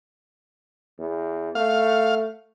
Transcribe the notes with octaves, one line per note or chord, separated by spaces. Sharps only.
E2
A3 F5